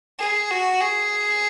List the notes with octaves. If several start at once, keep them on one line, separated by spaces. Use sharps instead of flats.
G#4
F#4
G#4